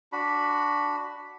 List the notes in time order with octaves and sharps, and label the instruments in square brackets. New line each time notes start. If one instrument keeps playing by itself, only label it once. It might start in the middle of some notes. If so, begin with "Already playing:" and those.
[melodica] D4 F#4 B5